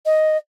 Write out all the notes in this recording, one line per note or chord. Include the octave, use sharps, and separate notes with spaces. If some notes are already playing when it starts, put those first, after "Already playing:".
D#5